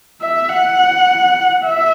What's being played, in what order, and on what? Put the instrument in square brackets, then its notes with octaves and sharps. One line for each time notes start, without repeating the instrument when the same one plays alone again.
[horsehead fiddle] E5
F#5
E5